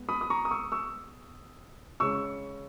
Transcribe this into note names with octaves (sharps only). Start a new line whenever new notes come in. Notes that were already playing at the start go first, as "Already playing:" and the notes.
Already playing: G#3 B3
B5 D#6
D#6
A#5 C#6
D#6
C#6 E6
C#6 E6
C#3 G#3 C#4 C#6 E6